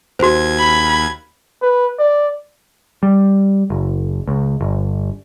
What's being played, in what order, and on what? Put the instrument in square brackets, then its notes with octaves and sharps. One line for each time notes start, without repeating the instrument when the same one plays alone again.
[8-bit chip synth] D#2 G#6 [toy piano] F#4 C5
[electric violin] B5
[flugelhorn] B4
D5
[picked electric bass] G3
F#1
C#2
G1